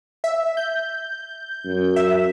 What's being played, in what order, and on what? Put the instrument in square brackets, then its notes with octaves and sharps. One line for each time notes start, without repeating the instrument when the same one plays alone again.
[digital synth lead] E5
G6
[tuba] F#2
[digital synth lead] E5